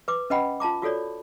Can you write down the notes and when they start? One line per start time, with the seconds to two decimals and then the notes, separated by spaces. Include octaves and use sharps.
0.08 B4 D6
0.30 C#4 B4 D#5 F#5 G5 B5
0.60 F4 A5 A#5 D6
0.82 F4 F#4 A4 C#5 D5